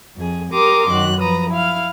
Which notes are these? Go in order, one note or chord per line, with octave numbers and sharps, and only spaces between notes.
F2 G#4
G4 A#4 A#5 C6 D6 D#6
F#2 D#3 F#4 F#6
F3 B4 A#5 D#6
E4 F5 F6